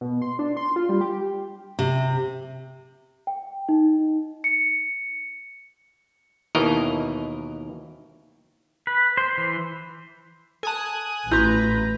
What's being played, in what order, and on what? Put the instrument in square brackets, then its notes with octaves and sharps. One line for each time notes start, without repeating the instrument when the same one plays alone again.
[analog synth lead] B2
C6
D4
C6
F4
G3
G4
[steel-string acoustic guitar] C3
[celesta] G5
D#4
C#7
[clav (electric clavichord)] D#2 B2 E3 A#4 D#5
[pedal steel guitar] B4
C5
E3
[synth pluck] A4 A5 [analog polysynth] G#5 D#6 F#6
[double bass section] A1 [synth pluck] E4 F#4 C6 [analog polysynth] B4 A#5 [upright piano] G6